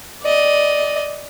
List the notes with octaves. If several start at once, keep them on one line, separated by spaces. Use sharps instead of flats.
D5 D#5